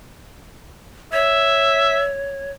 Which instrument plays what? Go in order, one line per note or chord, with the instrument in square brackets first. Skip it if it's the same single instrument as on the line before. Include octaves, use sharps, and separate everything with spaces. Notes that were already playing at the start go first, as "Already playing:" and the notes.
[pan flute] C#5 [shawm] E5